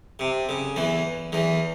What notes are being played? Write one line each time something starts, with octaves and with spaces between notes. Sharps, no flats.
C3
C#3
E2 E3
E2 E3